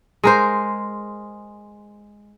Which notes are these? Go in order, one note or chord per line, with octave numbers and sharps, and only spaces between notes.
G#3 A#4 C5